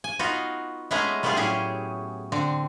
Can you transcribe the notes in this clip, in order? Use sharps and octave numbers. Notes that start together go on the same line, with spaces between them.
G#5
B3 D#4 F4 F#4
G#3 A3 B3 C#4 G#4 A#5
G3 A3 B3 E4 F4 G#4
A2 F#3 C#4 G4 G#4
D3 C4